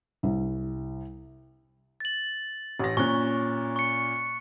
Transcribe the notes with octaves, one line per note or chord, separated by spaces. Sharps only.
C2
A6 F#7
A1 A#6
A#2 C#4 C#6 F#6
C#6 C#7